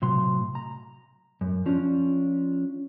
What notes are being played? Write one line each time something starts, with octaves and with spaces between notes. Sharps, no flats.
A2 C3 F#3 C6
A#5
F#2
F3 C#4 D4